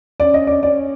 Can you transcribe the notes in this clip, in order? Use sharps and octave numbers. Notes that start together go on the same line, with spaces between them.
C#4 D5
D#5
D5
C#4 D5